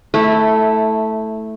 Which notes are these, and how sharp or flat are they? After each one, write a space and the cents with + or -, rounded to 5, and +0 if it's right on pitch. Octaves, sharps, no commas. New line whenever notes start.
A3 +0 E4 -15